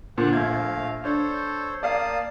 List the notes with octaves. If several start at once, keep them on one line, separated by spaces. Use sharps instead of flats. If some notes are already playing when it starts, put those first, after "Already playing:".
A#2 D3 C5 F#5
A#1 A3 F5 G#6
D4 A4 C5 C#5
A#3 D5 F5 A5 D#6